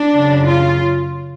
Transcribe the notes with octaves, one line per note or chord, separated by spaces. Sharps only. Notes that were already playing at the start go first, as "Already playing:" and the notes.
Already playing: D4
F#2 C#3
F4